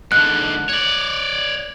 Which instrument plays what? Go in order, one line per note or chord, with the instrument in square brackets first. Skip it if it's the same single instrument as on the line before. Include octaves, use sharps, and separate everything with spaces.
[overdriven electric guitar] G#2 D3 [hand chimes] F#6
[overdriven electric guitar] C#5 D5